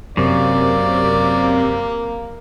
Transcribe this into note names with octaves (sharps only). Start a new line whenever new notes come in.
F#2 C3 A#3 D5